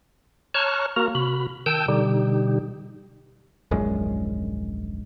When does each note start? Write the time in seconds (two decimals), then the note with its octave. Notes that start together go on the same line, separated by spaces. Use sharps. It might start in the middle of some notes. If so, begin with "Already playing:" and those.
0.54 C#5 A5 A#5 C#6 F6 F#6
0.96 A#3 F#4 A#4 A#5
1.15 C3 F#4 B5
1.66 D#3 G5 A5 E6 G6
1.88 B2 D3 G3 D#4 G4
3.71 D#1 A#1 F#2 G#3